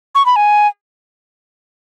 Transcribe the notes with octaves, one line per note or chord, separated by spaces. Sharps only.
C#6
B5
G#5